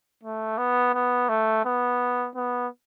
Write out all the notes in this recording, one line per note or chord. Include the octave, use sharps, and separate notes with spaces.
A3
B3
B3
A3
B3
B3